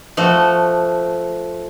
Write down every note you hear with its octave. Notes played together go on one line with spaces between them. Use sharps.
F3 A3 F#4